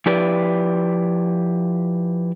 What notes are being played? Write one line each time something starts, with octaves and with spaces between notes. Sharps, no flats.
F3 E4 G4 B4 D5